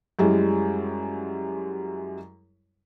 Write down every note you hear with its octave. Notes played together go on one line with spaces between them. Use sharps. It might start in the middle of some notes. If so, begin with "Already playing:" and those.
F#2 G3 G#3 E4